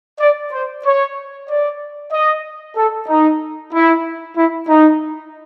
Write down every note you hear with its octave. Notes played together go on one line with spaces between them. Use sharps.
D5
C5
C#5
D5
D#5
A4
D#4
E4
E4
D#4